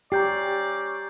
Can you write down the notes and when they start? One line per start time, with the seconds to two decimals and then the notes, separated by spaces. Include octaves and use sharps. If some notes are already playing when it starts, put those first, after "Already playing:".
0.12 C#4 G4 D5 A#5 G6 C7